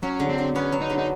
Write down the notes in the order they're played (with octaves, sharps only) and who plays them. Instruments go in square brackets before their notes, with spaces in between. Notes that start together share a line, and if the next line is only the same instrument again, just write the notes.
[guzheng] F#3 [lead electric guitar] C#4
[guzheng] D3
[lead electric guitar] C4
[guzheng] D3
[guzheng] B3 [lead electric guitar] C#4
[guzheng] F#3
[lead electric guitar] D#4
[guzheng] D3
[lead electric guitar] D#4